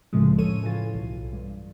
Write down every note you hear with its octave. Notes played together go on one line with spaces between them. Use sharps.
C2 F2 A2 C#3 F3 G#3
A4 C#5 D#7
E3 F4
B1
G2